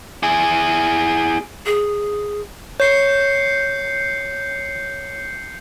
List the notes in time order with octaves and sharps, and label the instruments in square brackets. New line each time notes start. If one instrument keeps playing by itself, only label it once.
[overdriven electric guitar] E4 G#4
[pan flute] G#4
[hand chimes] C#5 [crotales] G6 C7 C#7